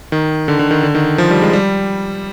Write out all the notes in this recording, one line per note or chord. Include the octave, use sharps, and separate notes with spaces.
D#3
D3
D3
D#3
D3
D#3
F3
G3
G#3
G3